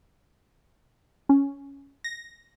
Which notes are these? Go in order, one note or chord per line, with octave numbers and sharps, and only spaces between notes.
C#4
A#6